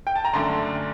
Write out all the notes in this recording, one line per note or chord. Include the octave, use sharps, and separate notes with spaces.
G5
A5
A#5
F#2 D3 A3 D4 A5 C6